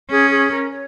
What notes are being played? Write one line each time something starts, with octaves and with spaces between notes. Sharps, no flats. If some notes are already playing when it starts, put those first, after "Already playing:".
C#4 G#4
G#4
A#4
C#5